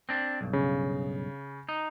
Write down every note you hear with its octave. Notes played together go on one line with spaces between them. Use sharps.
C4 D4
B1 G2
C#3
D#4